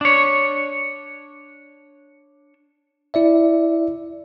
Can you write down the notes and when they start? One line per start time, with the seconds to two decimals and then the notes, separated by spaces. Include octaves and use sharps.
0.01 D4 C#5
3.14 E4 D5 E5